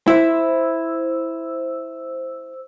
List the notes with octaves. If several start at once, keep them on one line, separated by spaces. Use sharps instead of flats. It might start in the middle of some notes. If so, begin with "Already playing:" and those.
E4 C5 E6